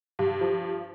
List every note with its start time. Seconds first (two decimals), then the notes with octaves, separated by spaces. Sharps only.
0.19 G2
0.41 F3